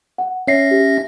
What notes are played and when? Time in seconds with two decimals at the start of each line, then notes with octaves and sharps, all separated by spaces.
0.18 F#5
0.47 C#4 C#5 E5 A#6 C7
0.71 G4